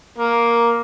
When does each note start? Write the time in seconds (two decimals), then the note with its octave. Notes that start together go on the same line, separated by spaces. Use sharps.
0.18 A#3